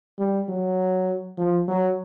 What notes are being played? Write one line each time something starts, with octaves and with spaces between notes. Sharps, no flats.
G3
F#3
F3
F#3